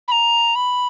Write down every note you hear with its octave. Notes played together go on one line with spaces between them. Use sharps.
B5
A#5
B5